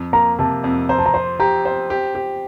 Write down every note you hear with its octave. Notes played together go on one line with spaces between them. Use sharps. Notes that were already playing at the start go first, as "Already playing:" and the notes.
Already playing: F2
A#3 A#5
C3 A5
F2
C5 A#5
A5
A#5
C5 C6
G4 A#5
C5
G4
G4